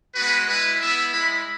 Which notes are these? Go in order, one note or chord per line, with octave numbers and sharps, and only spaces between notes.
G#3 B3 F#4 B4
G#3 E4 B4
B3 E4 E5
G#3 E4 B5